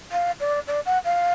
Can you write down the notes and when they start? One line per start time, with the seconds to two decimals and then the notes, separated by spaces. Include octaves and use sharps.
0.12 F5
0.40 D5
0.67 D5
0.86 F#5
1.04 F5